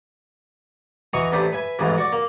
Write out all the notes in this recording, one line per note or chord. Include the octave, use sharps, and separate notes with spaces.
E3 F#4 D#5 A#5 C#6
A1 C3 D4 B4 C5 B5
B4 E5 G#5 B5
A1 F2 G#2 E3
F#4 D5
A#3